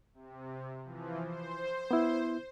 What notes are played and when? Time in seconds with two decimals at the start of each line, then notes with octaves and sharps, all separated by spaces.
0.14 C3
0.85 E3 F3
1.25 C5
1.91 B3 E4